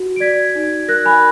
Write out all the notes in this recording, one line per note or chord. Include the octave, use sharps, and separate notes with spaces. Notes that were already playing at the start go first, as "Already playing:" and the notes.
Already playing: F#4
D7
D5 G#6 B6
D#4
A#4 F#6 A#6
G#5 B5